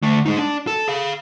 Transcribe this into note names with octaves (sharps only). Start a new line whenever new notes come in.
D3 A3
G#3 D#4
D4
A4
G#4 F5